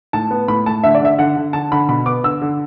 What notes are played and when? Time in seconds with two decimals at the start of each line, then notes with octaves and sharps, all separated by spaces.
0.13 A2 A5
0.31 B3
0.48 A2 B5
0.66 A3 A5
0.84 D3 E5
0.95 D5
1.01 D3 E5
1.18 D3 F#5
1.37 D3
1.53 D3 A5
1.72 D3 B5
1.88 B2 B5
2.06 B3 D6
2.23 D3 E6
2.42 D3